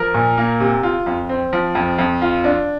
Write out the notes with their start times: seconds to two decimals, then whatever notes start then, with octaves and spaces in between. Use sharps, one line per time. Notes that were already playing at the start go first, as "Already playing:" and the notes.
Already playing: F3 A#4
0.14 A#2
0.37 A#3
0.60 C3
0.83 F4
1.06 F2
1.29 C4
1.53 F3
1.75 F2
1.98 F2
2.22 F4
2.44 D4